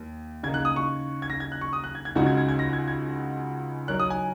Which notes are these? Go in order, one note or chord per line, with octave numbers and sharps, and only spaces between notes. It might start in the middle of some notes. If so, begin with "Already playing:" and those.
Already playing: D#2
C#3 A#3 D#4 G#6
F#6
D#6
C#6
G#6
A#6
G#6
F#6
C#6
D#6
F#6
G#6
G#6
C#2 C#3 G#3 D#4 F#4 G#6
G#6
G#6
G#6
A#6
G#6
G#6
F#3 D#4 A#4 C#5 F#6
D#6
G#5